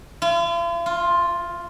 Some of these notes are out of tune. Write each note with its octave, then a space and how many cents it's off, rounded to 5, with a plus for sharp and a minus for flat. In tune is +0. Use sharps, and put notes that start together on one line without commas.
F4 -45
F4 +5